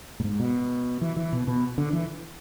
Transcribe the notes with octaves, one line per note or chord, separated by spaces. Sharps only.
A2
G#2
B2
E3
E3
B2
B2
D3
E3